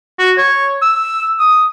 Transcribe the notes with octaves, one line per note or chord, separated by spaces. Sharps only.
F#4
C#5
E6
D#6